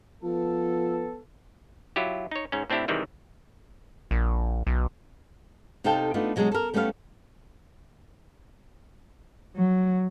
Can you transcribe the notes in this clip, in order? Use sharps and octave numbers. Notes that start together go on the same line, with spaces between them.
F3 B3 A4
F#3 E4 F4 G4
D#4 C#5
G#2 C#4
A2 C4 D4 E4 G4
C3 D#3 E3 G3 G#3
A#1
B1
C3 D#4 A4 F5 G5 A5
A3 B3 D4 D#4 F4
B2 F#3 G#3 D4 G#4
A4 A#4
G3 A3 B3 C#4 D5 F5
F#3